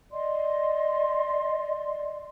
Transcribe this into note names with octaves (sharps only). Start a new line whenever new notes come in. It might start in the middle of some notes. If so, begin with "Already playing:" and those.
D5 D#5 C6